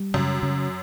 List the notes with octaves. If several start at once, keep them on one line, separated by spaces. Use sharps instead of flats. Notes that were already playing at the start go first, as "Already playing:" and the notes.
Already playing: G3
F#2 C#3
C#3